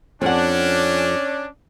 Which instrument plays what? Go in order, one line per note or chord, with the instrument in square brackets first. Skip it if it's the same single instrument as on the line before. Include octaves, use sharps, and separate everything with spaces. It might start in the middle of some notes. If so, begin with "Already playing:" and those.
[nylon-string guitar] F2 F#5 [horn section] C#4 D4